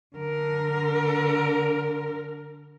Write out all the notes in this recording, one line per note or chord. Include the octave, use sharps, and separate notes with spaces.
D3 A#4